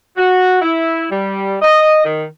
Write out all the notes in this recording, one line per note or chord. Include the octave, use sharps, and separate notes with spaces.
F#4
E4
G3
D#5
D#3